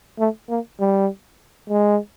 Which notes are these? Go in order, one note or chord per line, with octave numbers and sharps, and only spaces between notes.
A3
A#3
G3
G#3